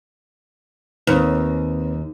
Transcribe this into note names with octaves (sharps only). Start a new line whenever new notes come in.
D#2 C4 B4